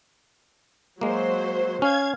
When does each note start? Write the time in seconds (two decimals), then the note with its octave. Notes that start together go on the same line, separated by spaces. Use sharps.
1.01 F#3 G#3 A#3 C5
1.82 C#4 F5 G#6